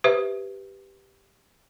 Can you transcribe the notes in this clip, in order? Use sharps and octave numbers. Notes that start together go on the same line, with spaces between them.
G4 B4 C5 E5